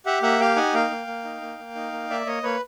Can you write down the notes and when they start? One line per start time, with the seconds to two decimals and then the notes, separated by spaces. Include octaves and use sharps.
0.06 G4 E5 F#5
0.22 A#3 E5 F#5
0.40 G4 F5 G5
0.56 D#4 F#5 G#5
0.74 A#3 F5 G5
0.91 A#3
1.07 A#3
1.24 D#4
1.41 A#3
1.58 A#3
1.75 D#4
1.92 A#3
2.10 A#3 D5 E5
2.27 A#3 C#5 D#5
2.43 A#3 B4 C#5